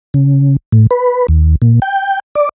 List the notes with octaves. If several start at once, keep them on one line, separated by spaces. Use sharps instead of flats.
C#3
A2
B4
D#2
A#2
G5
D5